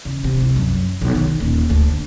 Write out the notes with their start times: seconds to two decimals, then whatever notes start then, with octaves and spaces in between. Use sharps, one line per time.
0.05 C#3
0.24 C3
0.41 C2
0.56 F#2
1.01 B1
1.15 D#3
1.40 D#1
1.70 D2
1.88 D3